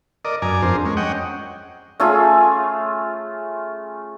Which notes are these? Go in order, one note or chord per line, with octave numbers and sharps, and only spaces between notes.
A#4 D5 D#5
F#2 D5 G#5 A#5
F2 D4 G#4 A#4 C5
G#3 C#4
C#5 D#5 F#5 G5
A3 C#4 F4 G#4